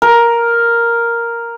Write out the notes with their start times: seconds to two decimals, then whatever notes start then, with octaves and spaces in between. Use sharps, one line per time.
0.02 A#4